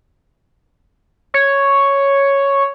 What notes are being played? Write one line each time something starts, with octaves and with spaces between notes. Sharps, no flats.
C#5